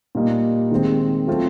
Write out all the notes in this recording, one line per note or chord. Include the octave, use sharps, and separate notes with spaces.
A#2 G3 A#3 D#4
D#3 G#3 C4
F#3 A3 C4 F4